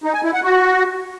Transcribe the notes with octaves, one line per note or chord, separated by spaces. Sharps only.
D#4
G#5
E4
F#5
F#4